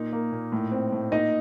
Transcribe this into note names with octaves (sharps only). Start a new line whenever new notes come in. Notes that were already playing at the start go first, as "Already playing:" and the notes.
Already playing: A#2 D#4
A#3
A#2
A2
C4
A2
A#2 D#4 D#5